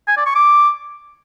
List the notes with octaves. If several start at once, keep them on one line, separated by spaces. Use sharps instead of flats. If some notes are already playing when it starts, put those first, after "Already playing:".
G#5
D5
C#6
D6